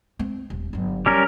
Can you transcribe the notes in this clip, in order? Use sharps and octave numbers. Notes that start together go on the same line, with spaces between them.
C4
D#1
G1 F#3
G3 C#4 A#4